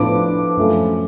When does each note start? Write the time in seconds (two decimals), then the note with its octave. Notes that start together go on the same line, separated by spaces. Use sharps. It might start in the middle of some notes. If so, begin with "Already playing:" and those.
Already playing: A2 F3 B3 D4 D6
0.57 F#2 F3 A3 C#4